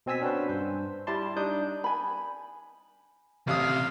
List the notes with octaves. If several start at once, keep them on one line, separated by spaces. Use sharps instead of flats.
B2 C4 G#5 E6 B6
C#4 D4 F#4 B4 C5
G2 C5
G3 E4 D5 A5 C6
G3 D4 D#4 D#6 G6
G#5 B5
A1 C3 F5 D#6